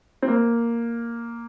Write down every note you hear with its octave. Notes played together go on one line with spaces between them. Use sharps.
C4
A#3